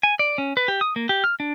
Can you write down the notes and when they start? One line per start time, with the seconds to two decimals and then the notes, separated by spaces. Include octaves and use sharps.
0.03 G#5
0.19 D5
0.38 C#4
0.57 B4
0.68 G4
0.81 D#6
0.96 A#3
1.09 G4
1.24 F6
1.40 D4